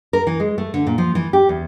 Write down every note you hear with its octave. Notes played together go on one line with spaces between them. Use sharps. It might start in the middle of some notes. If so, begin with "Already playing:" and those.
A#4
E3
G#3
A3
D3
A#2
F3
E3
G4
E2